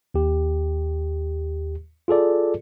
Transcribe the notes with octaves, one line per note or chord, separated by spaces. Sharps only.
D#2 G4
F4 G#4 A4 D5